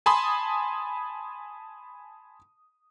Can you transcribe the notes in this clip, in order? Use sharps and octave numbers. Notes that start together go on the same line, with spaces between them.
G#5 A5 B5 C6 D#6